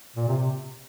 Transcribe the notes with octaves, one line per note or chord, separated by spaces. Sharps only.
A#2
C3